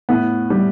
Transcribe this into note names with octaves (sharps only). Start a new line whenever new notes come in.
A2 B3
G3